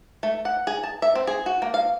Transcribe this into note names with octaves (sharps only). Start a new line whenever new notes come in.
A3
F#5
G#4
A5
E5
C4
G#4
F#4
A#3
F5